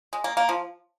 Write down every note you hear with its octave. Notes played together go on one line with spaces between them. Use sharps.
G#3
A#3
A#3
F3